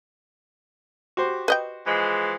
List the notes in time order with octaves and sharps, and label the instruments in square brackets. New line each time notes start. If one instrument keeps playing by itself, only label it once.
[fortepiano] F#4 G4 C5
[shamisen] B4 D#5 G5
[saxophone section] E3 F3 G#3